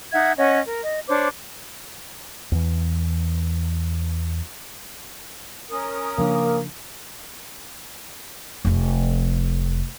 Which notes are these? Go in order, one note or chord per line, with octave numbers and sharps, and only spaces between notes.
D#4 E5 F#5 G#6
C#4 C#5 D#5 F#5
A#4
D#5
D4 C5 C#5 D6
E2 E3
C#4 A#4 D#6
C#3 F3 A#3 D4
F1 F2